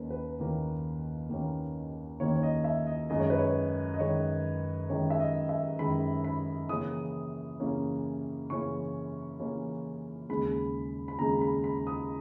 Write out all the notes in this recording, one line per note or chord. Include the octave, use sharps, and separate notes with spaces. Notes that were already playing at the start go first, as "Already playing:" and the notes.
Already playing: D#2 D#3 A#3 C#4 A#4 B4
B4
D#2 D#3 A#3 C#4
D#2 D#3 A#3 C#4
D#2 D#3 A#3 C#4 C#5
C#5
D#5
E5
D#5
F#2 D#3 G#3 D#5
C#5
B4
C#5
D#5
F#2 D#3 G#3 C#5
F#2 D#3 G#3 C#5
E5
D#5
E5
F#2 D#3 G#3 B5
B5
C#3 E3 A#3 C#4 D#6
C#3 E3 A#3 C#4
C#3 E3 A#3 C#4 C#6
C#3 E3 A#3 C#4
D#2 C#3 G#3 B5
B5
D#2 C#3 G#3 A#5
B5
B5
D#6